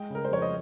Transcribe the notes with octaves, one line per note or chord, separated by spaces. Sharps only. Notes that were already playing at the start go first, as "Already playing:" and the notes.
Already playing: G#3 G5
C#3 A#4
C5
F2 C#5
D#5